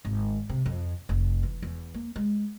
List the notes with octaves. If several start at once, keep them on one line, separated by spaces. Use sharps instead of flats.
G#1
C3
F2
F1
E3
E2
A#3
G#3